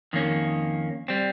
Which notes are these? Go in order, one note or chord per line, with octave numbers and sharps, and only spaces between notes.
F2 D#3 A#3 C#4
G3 C4